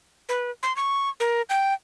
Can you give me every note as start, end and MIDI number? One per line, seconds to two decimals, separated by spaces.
0.29 0.51 71
0.63 0.75 84
0.76 1.09 85
1.20 1.42 70
1.50 1.73 79